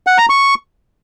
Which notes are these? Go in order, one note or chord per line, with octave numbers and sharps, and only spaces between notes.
F#5
A#5
C#6